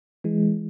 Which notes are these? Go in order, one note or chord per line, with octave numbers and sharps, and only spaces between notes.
E3 G#3